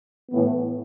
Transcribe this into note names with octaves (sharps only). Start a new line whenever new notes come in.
A2 E3 B3